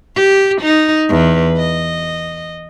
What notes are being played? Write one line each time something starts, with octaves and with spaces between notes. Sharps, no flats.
G4
D#4
E2 B4
D#5